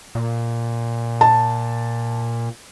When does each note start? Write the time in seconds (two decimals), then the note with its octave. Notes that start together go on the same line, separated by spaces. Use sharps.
0.15 A#2
1.21 A5